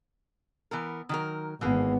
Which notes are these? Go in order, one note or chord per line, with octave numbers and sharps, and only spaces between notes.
E3 B3 A#4
D#3 F#3 A#4
G#1 E3 A#3 B3 G#4